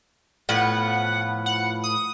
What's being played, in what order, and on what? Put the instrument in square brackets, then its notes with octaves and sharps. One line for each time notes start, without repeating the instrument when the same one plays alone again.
[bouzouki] A2 F3 B3 [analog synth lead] F#5
[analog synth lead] F#5
D#6